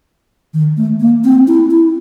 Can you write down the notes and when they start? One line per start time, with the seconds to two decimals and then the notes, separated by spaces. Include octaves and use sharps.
0.54 D#3
0.77 A3
1.00 A#3
1.24 C4
1.47 E4
1.71 E4